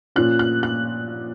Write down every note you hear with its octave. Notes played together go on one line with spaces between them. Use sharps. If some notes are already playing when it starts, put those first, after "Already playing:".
A#2 F3 A#3 C#4 F#6
F#6
F#6